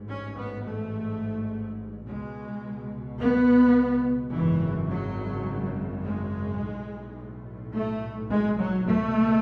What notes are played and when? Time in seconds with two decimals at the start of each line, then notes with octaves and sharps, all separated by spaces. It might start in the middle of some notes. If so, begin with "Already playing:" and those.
Already playing: A1 G#2
0.08 C#4
0.37 B3
0.65 A3
2.06 C#2 B2 G#3
3.19 B3
4.33 G#1 F#2 C#3 E3
4.89 F#3
6.02 G#3
6.60 B1 A2
7.73 A3
8.29 G#3
8.58 F#3
8.86 C#2 B2 A3